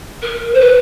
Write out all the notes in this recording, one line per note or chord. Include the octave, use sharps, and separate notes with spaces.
A#4
C5
B4